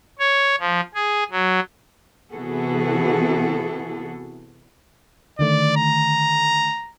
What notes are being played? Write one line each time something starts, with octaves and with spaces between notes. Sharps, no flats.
C#5
F3
G#4
F#3
C3 E3 B3 F#4 G#4 A4
D3 D#3 A3 D5
A#5